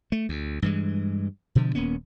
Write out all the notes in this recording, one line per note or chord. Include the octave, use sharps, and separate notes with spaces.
A3
D2
G2 E3 G#3
B2 D3 F3
D#1 A#3 B3 C#4